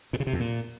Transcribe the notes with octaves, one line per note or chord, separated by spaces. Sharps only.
A#2
C#3
C3
F2
A#2